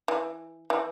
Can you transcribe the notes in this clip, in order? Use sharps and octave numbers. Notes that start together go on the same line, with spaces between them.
E3
E3